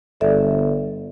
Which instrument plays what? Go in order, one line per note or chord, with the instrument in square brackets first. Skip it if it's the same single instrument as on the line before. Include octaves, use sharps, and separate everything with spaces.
[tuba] G1 [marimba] A4 D5 E5